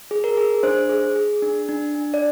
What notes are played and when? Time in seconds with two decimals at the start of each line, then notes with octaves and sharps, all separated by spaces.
0.11 G#4
0.24 A#4
0.37 G#4
0.63 D4 C5
0.89 G#4
1.16 G#4
1.42 D4
1.69 D4
1.95 D4
2.14 D5